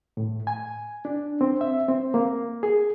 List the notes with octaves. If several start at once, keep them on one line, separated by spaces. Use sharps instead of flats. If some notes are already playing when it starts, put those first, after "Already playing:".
A2
G#5
D4
C4
E5
C4
A#3
G#4